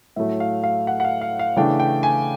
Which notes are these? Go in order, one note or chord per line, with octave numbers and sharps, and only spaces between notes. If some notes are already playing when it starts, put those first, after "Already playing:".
A2 F#3 A3 E5
F5
F5
F#5
F#5
F5
F5
F5
C#3 E3 A3 D4 G5
G5
G#5